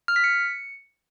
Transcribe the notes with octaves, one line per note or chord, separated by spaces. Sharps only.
F6
B6
C#7